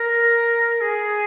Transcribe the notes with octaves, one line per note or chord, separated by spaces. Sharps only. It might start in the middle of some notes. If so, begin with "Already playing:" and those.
Already playing: A#4
G#4